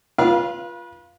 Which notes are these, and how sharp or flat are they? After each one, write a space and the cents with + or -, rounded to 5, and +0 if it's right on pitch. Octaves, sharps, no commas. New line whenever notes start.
F4 +0 B4 -30 F5 -20